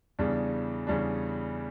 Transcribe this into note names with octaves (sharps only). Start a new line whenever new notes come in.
E2 C#3 G3 D4
E2 C#3 G3 D4